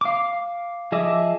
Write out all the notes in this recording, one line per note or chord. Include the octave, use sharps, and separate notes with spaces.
F5 D6
F3 G#4 D#5 E5 D6